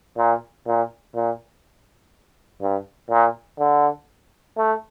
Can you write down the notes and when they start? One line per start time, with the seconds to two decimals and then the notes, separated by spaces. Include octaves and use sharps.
0.18 A#2
0.67 A#2
1.15 A#2
2.62 G2
3.10 A#2
3.59 D3
4.58 A3